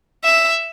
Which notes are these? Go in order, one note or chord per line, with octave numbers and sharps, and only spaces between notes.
E5